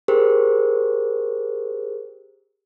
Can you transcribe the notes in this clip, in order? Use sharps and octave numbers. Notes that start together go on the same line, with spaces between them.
G4 G#4 A#4 C5